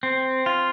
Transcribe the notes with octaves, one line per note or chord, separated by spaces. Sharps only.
C4
F4